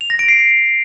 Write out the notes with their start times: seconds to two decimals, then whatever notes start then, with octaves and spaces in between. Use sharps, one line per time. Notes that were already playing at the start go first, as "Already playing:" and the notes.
0.01 F7
0.10 A#6
0.19 D7
0.28 C7